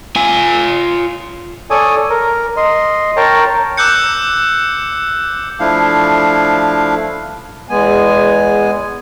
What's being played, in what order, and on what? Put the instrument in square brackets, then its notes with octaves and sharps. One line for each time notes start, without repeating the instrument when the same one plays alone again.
[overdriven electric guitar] F4 G#5
[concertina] A4 C#5 D5 G#5 D#6
A#4
D#5 C6
A#4 C#5 G5 A5 A#5
[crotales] D6 E6 F#6 G6 C#7
[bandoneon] F3 A3 D4 E4 F5
[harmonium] E2 G#3 B3 G#5